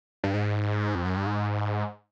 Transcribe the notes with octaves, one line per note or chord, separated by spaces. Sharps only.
G2
G#2
F2
F#2
G2
G#2